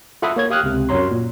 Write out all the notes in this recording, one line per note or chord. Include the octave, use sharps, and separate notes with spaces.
F4 A4 E5 F#5 B5 D#6
A#3 C#5 G#6
G4 F5 D#6 F6 F#6
C#2 C3
F#2 F#3 F#4 C#5 A#5 C6
A#2